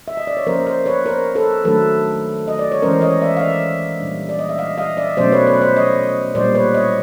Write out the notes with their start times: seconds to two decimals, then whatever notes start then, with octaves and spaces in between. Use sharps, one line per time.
0.08 E5
0.17 D#5
0.27 D5
0.37 C#5
0.46 F3 A#3 C#4 A#4 C5
0.66 A#4 C5
0.86 B4 C#5
1.06 A#4 C5
1.35 A4 B4
1.65 D#3 F#3 A3 D4 A4 B4
2.48 D#5
2.59 D5
2.71 C#5
2.82 E3 G#3 C#4 A#4 C5
3.01 C#5 D#5
3.21 D5 E5
3.37 F5
3.41 D5 E5
4.00 A#2 G3 A#3 D4
4.29 D5
4.39 D#5
4.49 E5
4.59 D#5 F5
4.78 D#5 F5
4.97 D5 E5
5.17 B2 F#3 A3 C#4 C5 D5
5.32 B4 C#5
5.47 B4 C#5
5.62 C5 D5
5.76 C#5 D#5
6.35 A#2 G3 A#3 D4 C5 D5
6.55 B4 C#5
6.74 C#5 D#5